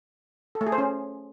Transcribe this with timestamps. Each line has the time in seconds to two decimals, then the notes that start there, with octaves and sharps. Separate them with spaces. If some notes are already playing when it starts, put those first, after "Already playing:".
0.55 A4
0.61 A3
0.67 G#4
0.72 C5
0.78 C#4